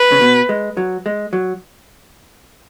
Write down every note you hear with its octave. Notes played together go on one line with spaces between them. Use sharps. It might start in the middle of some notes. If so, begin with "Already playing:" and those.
Already playing: B4
C#3
B2
G#3
F#3
G#3
F#3